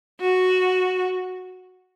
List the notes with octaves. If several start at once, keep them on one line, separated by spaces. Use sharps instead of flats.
F#4